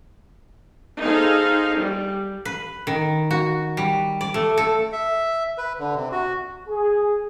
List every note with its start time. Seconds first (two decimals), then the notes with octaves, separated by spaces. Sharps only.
1.00 D#4 G#4 A4 C5 F5
1.79 G3
2.45 B4
2.87 D#3
3.31 F#4
3.77 G3
4.21 D5
4.34 A3
4.57 A4
4.92 E5
5.58 B4
5.79 D3
5.95 C3
6.12 F#4
6.67 G#4